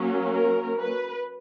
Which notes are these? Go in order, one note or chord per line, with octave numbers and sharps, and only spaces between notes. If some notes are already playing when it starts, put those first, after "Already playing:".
Already playing: F#3 A#3 C#4
A#4
B4